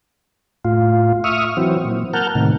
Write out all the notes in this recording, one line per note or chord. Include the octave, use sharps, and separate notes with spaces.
A2 F4
E5 C#6 D#6 F6
E3 F#3 C4
A#2
A#4 F#5 A5 F6 G6
A2 C3 D#3